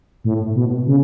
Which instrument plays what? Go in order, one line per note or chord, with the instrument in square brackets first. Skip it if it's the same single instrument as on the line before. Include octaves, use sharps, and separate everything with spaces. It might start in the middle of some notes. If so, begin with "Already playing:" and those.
[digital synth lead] A2
B2
C#3